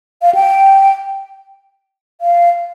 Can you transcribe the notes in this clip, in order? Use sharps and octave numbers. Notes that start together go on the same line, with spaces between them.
F5
G5
F5